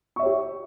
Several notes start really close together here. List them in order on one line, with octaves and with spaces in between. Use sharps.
C#6 E5 C#5 G4